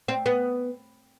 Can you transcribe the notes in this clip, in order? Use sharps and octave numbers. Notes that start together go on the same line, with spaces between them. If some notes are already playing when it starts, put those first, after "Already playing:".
C4
B3